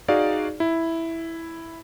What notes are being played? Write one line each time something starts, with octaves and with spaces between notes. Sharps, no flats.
D#4 F#4 G#4 D5 F5
E4